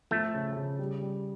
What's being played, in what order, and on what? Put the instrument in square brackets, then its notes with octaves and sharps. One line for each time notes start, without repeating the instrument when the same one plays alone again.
[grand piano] F3 [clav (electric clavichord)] A3
[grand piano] C#3
C#3
G3
G3